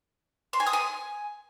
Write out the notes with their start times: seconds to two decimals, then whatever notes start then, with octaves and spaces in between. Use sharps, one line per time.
0.53 C6
0.60 G#5
0.67 D#6
0.73 G#5